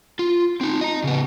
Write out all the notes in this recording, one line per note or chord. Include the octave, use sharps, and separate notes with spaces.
F4
C4 D#4
D#5 A#5
C#3 B3